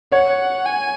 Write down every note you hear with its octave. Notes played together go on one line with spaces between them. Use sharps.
C#5 F#5
G#5